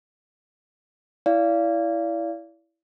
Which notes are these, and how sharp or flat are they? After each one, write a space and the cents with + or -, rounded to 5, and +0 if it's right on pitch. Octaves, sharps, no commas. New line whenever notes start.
E4 +0 D5 -30 F5 -25